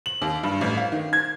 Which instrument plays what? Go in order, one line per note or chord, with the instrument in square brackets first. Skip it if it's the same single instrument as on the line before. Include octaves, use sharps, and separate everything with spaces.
[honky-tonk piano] F#7
D#2
G2
A1
F5
D#3
G#6